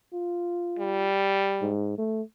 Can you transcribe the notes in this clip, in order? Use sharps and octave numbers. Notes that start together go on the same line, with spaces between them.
F4
G3
G#2
A3